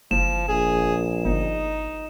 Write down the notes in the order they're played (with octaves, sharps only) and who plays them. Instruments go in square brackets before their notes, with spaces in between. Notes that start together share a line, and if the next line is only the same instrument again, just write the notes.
[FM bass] F#1 [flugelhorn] F3 [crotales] E7
[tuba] A#1 [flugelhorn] G#4
[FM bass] G1 [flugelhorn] D#4